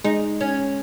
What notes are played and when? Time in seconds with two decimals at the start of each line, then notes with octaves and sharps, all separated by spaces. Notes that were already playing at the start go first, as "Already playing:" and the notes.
0.04 G#3 D#4
0.41 C#4